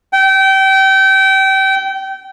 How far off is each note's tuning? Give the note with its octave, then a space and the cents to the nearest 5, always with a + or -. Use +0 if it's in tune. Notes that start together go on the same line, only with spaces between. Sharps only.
G5 -30